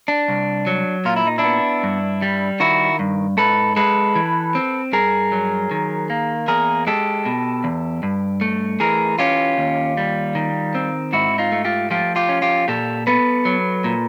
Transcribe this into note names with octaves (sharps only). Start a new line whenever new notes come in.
D4
C2
F#3
A#2 F4
E4
D#4
D4 E4
B3
G2
G3
D#3 E4 F#4
G2
G#2 A4 B4
G#3 A4 B4
E3
C4
G2 G#4 A#4
F#3
D#3
A#3
E2 G#4 A#4
G#3 G4 A4
B2
E2
G2
A3
E3 G#4 A#4
C#4 F4 G4
D#2
G3
D#3
C4
G#2 E4 F#4
D#4 F4
A3
F4 G4
F3 F4 G4
F4 G4
C#4
F4 G4
A#2 G4 A4
B3 A4 B4
F#3
A#2